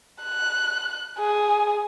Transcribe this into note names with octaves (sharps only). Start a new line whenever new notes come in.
F#6
G#4